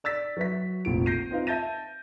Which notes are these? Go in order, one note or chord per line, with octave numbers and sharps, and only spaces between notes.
D5 E6 A6 B6
F#3 F#4 B4 E5 B6
F1 A#1 F3 D7
G6 A#6 C7 D#7
C4 D#4 F4 B4 F5
E5 A5 G6 A6 A#6 D#7